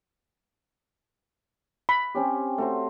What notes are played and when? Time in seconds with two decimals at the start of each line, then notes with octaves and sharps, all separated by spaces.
1.89 B5
2.15 C4 C#4 G4
2.58 A3 F#4 C5